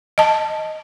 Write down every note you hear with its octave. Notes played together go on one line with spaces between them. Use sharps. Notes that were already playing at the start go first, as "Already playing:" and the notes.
D#5 A5